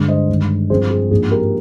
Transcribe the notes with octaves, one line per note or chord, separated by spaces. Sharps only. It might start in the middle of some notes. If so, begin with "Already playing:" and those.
Already playing: G2 D3 G#3 D4
C5 D#5
G2 D#3 G#3
G2 F3 C4 G#4 C5
G#4
G#2 F3 A#3 D4 G#4
G4 A#4